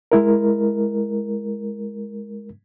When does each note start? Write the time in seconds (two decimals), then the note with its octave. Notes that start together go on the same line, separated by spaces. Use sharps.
0.12 G#3 E4 A#4